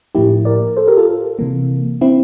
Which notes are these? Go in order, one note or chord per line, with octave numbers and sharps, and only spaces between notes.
A2 F3 A#3 E4 G4
A#4 D5
A4 C5
G4 A#4
F4 A4
C3 E3 A#3
C4 E4